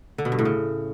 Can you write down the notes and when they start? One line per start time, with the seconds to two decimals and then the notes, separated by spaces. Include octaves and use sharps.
0.18 D3
0.25 B2
0.32 G2
0.39 A2
0.45 C#3